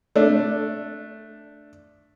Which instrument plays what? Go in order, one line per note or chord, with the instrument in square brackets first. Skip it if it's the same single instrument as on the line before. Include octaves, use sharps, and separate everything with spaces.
[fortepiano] A3 D4